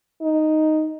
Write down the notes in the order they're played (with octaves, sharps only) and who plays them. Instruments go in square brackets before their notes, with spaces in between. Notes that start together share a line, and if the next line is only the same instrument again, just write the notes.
[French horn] D#4